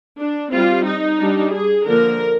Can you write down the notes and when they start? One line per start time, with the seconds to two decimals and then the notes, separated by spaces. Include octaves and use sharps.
0.18 D4
0.51 G3 C4 F4
0.86 D#4
1.19 G3 D4
1.53 G#4
1.87 D3 F3 A#3 D4 A#4